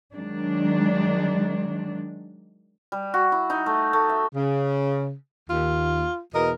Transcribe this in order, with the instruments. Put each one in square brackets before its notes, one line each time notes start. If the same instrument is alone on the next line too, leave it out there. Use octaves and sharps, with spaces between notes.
[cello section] D#3 F#3 G#3 D4
[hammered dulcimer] G3
F#4
E4
D#4
A3
A3
E5
[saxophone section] C#3
[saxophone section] D#2 [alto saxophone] F4
[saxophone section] E2 B2 A#4 [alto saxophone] D#5